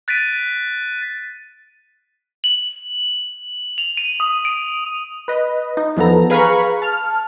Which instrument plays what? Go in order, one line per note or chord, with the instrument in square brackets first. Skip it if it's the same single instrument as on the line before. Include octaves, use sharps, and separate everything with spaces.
[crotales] F#6 A6 B6 D7 D#7
F#7
F7
D#7
D#6
D7
[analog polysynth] B4 D#5
D#4
E2 F3 B3 A4 A#5
G#4 B4 F5 A#5 B5 C#6
A5 F6